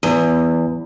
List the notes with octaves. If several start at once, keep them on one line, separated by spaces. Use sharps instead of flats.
E2